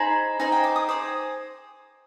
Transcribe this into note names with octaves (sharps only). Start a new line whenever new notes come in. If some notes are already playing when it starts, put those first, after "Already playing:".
Already playing: D#4 G#4 C5 B5
D#4 G#4 C5 G#5
G5
D6
D#6
G#4 C5 D6